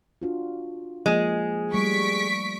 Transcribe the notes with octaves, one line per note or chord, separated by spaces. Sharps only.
D4 F4 F#4
F3 G#3 A#3 G#4
G3 A3 C#6 B6 D7